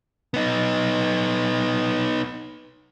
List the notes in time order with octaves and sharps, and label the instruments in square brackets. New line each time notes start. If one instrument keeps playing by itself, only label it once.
[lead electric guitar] B3 D#4